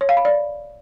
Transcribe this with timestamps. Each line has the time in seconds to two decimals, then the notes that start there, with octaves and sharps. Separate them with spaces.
0.01 C#5
0.09 F5
0.17 B5
0.25 D5